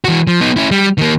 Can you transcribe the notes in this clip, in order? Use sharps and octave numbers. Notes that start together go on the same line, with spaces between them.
E3 F#4
F3
B3 D#4
C#4 E4
G3
D#3 A#3